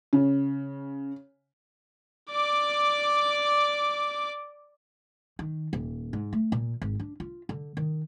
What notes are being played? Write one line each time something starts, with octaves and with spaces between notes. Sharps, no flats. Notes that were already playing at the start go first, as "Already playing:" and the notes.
C#3
D5 D6
D#3
D#1
G#2
A3
A#2
G#1
D4
F4
D3
D#3